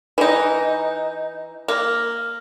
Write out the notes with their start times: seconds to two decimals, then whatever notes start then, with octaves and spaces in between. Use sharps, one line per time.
0.18 E3 D#4
1.68 A#3